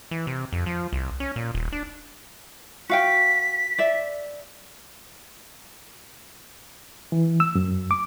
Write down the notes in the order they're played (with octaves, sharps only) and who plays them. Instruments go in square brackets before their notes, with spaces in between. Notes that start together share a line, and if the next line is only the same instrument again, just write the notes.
[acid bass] E3
C3
F2
F3
C2
C#4
A#2
D#1
D4
[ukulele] F#4 F5 G5 [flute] B6
[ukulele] D5 E5
[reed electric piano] E3
E6
F#2
D6